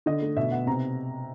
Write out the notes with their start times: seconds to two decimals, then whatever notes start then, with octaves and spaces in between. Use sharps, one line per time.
0.06 D3 D#5
0.21 A3
0.37 B2 E5
0.52 B3 F#5
0.67 C3 A#5